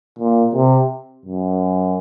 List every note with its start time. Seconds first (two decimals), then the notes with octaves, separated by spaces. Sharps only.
0.19 A#2
0.54 C3
1.25 F#2